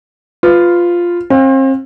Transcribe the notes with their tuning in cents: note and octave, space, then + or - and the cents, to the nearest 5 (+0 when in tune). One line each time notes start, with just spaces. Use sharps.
F4 +0 B4 +20
C4 +40 F5 +35